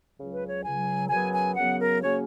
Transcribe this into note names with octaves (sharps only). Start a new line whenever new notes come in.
C#2 C#3 F#3
B4
C#5
C#2 C#3 F#3 G#5
F#2 C#3 F#3 B3 G#5
G#5
F#2 C#3 F#3 B3 F#5
A#4
C#3 F#3 A#3 C#4 C#5